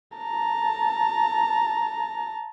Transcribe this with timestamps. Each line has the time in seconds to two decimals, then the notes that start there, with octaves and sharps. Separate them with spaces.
0.18 A5 A#5